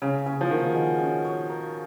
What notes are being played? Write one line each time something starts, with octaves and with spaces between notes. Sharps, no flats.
C#3 C#4
C#3 C#5
F3
D#3 F#4
G#3
C#4
C#5
A#4